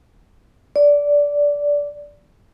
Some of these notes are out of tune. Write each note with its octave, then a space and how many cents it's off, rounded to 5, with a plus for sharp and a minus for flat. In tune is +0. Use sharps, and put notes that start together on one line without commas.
D5 -15